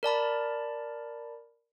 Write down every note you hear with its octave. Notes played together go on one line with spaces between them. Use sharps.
A#4 D5 A5 B5